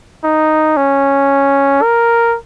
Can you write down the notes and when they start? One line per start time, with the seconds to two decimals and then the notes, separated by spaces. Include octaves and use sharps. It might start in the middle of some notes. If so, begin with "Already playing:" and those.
0.24 D#4
0.77 C#4
1.82 A#4